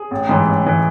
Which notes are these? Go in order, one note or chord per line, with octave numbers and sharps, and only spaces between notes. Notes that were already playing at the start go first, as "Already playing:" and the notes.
Already playing: G#4
A1
G#2 E3
A1
G#2 E3